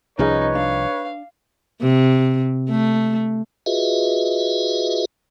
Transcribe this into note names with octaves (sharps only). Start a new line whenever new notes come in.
C2 F3 C#4 D#4 G#4 B4 C#5 D#5
D4 F5
C3
A3
F4 F#4 G#4 B4 D#5 E5